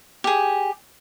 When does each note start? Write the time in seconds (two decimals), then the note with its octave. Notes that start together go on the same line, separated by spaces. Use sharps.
0.24 G4 G#4